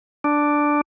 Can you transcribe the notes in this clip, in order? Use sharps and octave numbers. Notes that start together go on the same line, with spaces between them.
D4